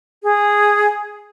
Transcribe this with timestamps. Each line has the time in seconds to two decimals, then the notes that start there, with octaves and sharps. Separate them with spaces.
0.23 G#4